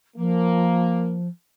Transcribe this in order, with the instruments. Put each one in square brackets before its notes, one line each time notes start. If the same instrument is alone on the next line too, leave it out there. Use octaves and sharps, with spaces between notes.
[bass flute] F3 [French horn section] A#3